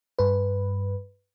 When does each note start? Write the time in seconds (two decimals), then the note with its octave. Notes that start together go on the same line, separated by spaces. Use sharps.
0.19 G2 B4